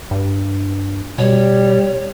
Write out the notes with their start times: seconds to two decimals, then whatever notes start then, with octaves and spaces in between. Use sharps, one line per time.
0.11 G2
1.18 B2 G3 C#5